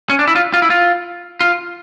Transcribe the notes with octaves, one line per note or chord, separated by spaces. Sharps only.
C#4
D4
E4
F4
F4
E4
F4
F4